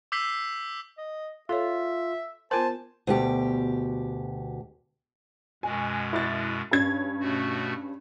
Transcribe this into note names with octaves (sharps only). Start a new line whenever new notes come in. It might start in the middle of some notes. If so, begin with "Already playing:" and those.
D6 E6 G6 B6 C7 G7
D#5
F4 A4 C#5 E5
B3 F4 A#4 C5 G#5 A5
D2 B2 G4
F#2 B2 G#3 G#5
E4 D6 A6
G2 C#4 G#6
B2 A3 F#4